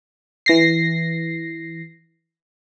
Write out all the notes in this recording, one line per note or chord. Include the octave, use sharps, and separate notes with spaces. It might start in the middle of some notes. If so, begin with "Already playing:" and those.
E3 A#6 C7